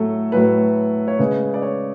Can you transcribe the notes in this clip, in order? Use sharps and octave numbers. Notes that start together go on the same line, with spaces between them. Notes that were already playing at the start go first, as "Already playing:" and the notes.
Already playing: A2 F#3 A3 A4
A2 F#3 A3 B4
C#5
C#3 G#3 B4
D5
C#5